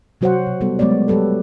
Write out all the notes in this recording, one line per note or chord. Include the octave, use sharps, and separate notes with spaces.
C3 F#3 F#4 C5 C#5 F#5
B2
G3 B3 A4
F#3 G#3 A3 B3 C#5 D5
F#3 G3 G4 A4 B4